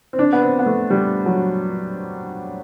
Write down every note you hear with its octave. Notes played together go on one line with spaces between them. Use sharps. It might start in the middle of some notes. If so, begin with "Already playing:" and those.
C4
D4
B3
C4
B3
A3
G3
F#3